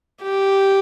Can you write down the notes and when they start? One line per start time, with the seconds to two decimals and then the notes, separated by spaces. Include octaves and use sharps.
0.23 G4